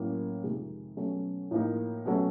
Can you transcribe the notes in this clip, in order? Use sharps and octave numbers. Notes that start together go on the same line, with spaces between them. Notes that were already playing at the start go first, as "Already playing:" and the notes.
Already playing: A2 F#3 A#3 C#4
F2 C3 D#3 G#3
B2 F#3 A3 C#4
A2 F3 A#3 D#4
B2 F#3 A3 C#4